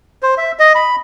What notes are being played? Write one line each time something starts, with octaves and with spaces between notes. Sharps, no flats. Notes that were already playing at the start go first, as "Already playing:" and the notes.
C5
E5
D#5
B5